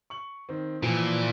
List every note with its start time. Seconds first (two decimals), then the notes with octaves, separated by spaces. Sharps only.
0.10 C#6 F#7
0.49 D#3 C4
0.83 A#2 E3 F3